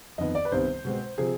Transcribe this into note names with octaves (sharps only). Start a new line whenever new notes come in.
F2 D#3 B3 D#5
D5
B4
C2 C3 D#3 G3 B3 C5
B2 G#3 C4
C3 F3 C4 G#4